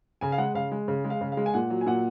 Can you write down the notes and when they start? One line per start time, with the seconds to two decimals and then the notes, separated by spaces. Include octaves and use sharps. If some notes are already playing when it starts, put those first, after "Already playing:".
0.21 C#3 G#5
0.32 F5
0.38 G#3 F#5
0.54 C#3 F5
0.72 G#3
0.88 C#3
1.04 G#3
1.10 F5
1.21 C#3
1.32 F5
1.37 G#3
1.46 G#5
1.54 A#2 F#5
1.70 F#3
1.81 G#5
1.86 A#2 F#5